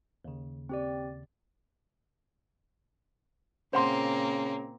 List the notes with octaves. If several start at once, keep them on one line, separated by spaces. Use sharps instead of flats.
D#2 C#3
C4 G4 D5
A#2 C#3 A#3 C4 C5 F#5 C6